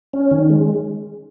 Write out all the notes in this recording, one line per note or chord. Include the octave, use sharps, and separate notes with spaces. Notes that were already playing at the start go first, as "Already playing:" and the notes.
C#4
D#3
G#3